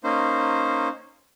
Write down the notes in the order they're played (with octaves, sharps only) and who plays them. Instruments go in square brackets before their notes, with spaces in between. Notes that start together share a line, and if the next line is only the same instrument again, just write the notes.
[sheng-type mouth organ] A#3 C#4 D#4 C5